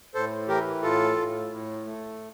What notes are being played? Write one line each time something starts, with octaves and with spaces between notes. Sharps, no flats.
A2 A4 C5
E3 G4 A#4
A2 F4 A4
A2
A2
A3